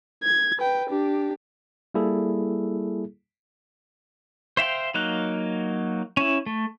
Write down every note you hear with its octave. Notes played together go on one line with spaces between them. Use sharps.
G#6
B4 G5
D4 G4
G3 A#3 E4 G#4 A4
C5 E5 F5 G5
F#3 A#3 D#4 F5 F#6
C#4 E4
A3